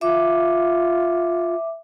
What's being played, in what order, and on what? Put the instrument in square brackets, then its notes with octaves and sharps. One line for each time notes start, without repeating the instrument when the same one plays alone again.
[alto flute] F4 [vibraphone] E5 D6